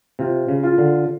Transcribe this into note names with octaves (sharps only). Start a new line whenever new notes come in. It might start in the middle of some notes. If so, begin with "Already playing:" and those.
C3 F4
C#3
F4
D3